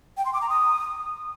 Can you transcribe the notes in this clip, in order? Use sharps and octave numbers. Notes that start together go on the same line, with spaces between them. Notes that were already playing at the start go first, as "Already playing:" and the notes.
G5
C6
D6
A#5
D#6